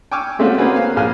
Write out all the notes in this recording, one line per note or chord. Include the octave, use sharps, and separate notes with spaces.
G5 G#5 C#6 D6 E6 F6
G#3 A3 C4 C#4 F4 F#4
A#3 C4 C#4 F#4 G#4 B4
F5
A#1 G#4 F5 G#5 F6